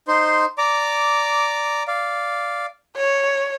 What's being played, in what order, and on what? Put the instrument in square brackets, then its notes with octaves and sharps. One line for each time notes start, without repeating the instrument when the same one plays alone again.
[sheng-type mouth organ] D#4 C5 C6
D5 A#5 D6
D5 F5
[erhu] C#5